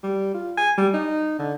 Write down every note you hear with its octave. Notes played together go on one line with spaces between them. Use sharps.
G3
F4
G#5
G3
D#4
D3